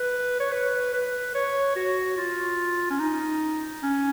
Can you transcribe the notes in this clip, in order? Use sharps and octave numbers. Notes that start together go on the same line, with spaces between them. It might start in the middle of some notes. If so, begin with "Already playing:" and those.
Already playing: B4
C#5
B4
B4
C#5
F#4
F4
C#4
D#4
C#4